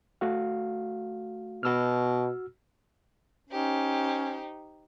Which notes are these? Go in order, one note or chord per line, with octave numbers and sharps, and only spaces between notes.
A3 F#4 F5
B2 F#4 E6 F6
C#4 D#4 G4 C5